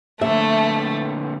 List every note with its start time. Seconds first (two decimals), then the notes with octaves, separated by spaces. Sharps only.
0.21 A#2 D3 A3 E5